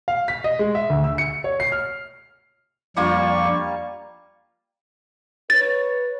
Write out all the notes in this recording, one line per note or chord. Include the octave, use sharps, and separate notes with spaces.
F5
B6
D#5
G#3
E5
D2
E6
C#7
C#5
C7
F6
F2 G3 A#3 D4 F4 C#6
B4 C#5 A6